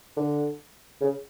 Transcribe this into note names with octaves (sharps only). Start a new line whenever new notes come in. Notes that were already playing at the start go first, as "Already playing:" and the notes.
D3
C#3